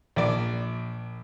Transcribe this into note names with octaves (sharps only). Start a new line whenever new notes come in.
A#1 D5